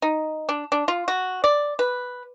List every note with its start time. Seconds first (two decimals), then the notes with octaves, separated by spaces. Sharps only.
0.02 D#4
0.49 D4
0.72 D4
0.88 F4
1.08 F#4
1.44 D5
1.79 B4